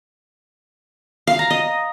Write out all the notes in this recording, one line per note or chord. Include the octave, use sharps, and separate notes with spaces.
F5
A#5
D#5